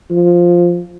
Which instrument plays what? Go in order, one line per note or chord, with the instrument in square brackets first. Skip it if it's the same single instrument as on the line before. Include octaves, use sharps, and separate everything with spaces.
[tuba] F3